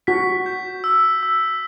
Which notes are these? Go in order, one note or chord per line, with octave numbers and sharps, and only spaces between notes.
F#4 B6
G6
E6
E6